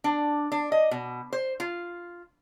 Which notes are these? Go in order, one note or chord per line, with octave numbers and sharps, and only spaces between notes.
D4
D4
D#5
B2
C5
F4